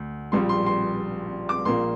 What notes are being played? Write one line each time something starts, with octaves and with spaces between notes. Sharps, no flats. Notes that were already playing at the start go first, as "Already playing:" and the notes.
Already playing: D2
A#1 A#2 G3 C6
C6
C6
D6
A#1 A#2 A#3 C6